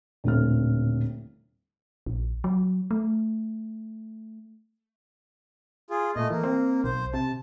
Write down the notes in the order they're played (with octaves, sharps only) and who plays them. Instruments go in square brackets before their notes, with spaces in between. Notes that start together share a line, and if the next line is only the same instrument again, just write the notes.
[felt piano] D#1 A2 D3 A3 C4 F6
[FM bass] A#1
F#3
A3
[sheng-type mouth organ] F4 G#4
[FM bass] A#2 [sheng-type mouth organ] A3 D#5
[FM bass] E3 [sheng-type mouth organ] A#3
[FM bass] C4
[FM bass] B1 [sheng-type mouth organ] C5
[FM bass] C3 [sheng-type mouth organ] A5